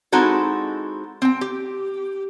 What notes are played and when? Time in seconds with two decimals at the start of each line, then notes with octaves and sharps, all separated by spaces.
0.12 G#3 C4 D#4 E4 F#4 A4
1.22 C4 G5
1.41 G4